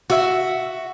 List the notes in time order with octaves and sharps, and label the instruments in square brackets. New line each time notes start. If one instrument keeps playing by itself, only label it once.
[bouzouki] F#4 E5